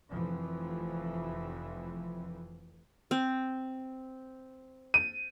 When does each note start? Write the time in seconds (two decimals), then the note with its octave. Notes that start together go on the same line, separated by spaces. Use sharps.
0.11 F1 F2 E3 F3
3.11 C4
4.94 D#7